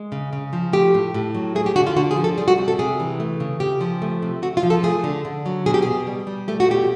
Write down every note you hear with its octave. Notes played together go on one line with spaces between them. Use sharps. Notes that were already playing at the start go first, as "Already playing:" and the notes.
Already playing: G#3
C#3
C#3
F3
A3 G4
A2
A2
F#3
A3 G#4
G4
D3 F#4
F4
D3 F#4
G#4
F3
A4
G3 G#4
F#4
C3
A4
C3 G#4
E3
A3
C#3
C#3 G4
F3
A3
C3
C3 F#4
F4
F3
A4
A3 G#4
D3
D3
F#3
B2 G#4
G4
B2 G#4
G3
G3
A3 G4
F#4
B2 G4